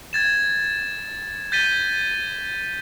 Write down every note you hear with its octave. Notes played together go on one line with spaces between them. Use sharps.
G#6 A6 E7
G6 A6 B6 D#7 G7